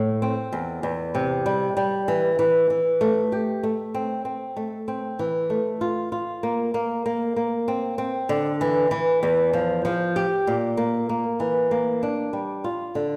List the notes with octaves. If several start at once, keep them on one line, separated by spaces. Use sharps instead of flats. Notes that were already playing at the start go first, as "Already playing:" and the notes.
Already playing: A2
C4
E2
E2
C3
G3
G3
E3
E3
E3
A3
G4
A3
C4
C4
A3
C4
E3
A3
F4
F4
A#3
A#3
A#3
A#3
C4
C4
D3
E3
E3
E2
F3
F3
G4
A#2
A#3
A#3
E3
A#3
D4
G3
F4
D3